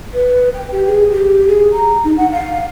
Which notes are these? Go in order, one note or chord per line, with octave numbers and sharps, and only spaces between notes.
B4
G5
G4
G#4
G4
G#4
A#5
D#4
F#5
F5